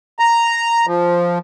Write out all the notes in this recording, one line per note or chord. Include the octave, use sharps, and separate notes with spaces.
A#5
F3